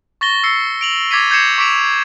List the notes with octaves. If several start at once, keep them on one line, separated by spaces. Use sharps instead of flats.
C#6 A6 A#6 G7
E6 C7 C#7
D7 F7 F#7
D6 G#6 A6 B6 C7 D#7
G6 G#6 A#6 C7 C#7 E7
C#6 D6 B6 D7 E7 F7